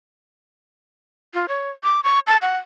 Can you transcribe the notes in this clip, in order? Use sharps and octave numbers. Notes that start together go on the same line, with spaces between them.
F4
C#5
D6
C#6
A5
F#5